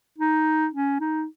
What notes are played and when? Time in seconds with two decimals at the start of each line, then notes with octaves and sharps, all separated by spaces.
0.18 D#4
0.73 C#4
1.00 D#4